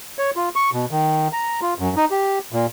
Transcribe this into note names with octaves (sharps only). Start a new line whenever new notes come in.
C#5
F4
C#6
B2
D#3
A#5
F4
F#2
D#4
G4
A#2